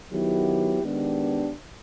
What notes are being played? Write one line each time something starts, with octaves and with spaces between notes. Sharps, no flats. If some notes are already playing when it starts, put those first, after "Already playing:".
D#3 F#3 B3 E4 G4
D#3 G#3 B3 D4 G4